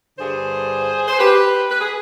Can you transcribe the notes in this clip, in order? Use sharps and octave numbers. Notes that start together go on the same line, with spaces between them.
G2 D3 G#4 C5
C5
G4 B4
B4
G#4